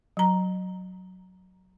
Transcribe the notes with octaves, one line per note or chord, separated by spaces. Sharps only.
F#3 A#5